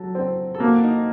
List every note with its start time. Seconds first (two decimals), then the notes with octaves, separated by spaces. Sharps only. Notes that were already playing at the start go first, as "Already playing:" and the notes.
Already playing: F#3 A4
0.15 C4
0.54 A4
0.60 A#3 F#4
0.83 D#4